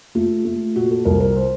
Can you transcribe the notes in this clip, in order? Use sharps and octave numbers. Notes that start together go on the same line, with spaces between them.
A3 F4
A3
A#2 F#4
A4
C2 A#4
C5
A#4
C5